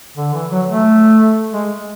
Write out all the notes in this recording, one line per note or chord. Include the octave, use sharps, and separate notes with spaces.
D3
E3
F#3
A3
G#3